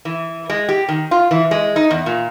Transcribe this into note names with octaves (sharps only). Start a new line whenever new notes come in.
E3
G#3
G4
D#3
F4
E3
G#3
D#4
E2
A#2